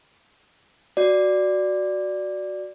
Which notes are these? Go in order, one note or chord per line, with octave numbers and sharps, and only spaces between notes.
F#4 D5